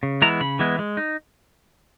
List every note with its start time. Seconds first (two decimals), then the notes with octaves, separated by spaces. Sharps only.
0.03 C#3
0.22 E3 G#3 B3 E4 A#5
0.41 C#3 B5
0.59 E3 G#3 B3 E4
0.79 G#3
0.97 D#4